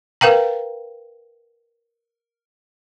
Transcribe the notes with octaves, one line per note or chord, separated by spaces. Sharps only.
A#4 B4 F5 G5 A#5